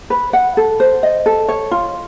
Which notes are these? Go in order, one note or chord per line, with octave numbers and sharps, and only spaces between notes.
B4
F#5
A4
C5
D#5
A4
C#5
F4